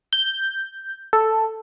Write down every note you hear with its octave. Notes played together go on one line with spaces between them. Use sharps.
G6
A4